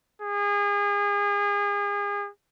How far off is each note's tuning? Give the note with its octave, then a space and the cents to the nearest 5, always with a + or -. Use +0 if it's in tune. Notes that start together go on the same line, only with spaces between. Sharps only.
G#4 -35